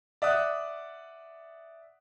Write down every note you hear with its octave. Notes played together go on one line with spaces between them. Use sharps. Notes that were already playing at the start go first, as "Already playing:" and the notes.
D5 E5 F#5 D#6 F#6